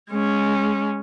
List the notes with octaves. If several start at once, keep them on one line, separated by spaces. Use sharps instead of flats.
G#3 C#4